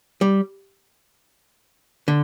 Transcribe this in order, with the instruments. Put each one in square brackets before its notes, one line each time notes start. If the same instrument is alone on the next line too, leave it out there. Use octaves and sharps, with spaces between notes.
[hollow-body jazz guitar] G3
D3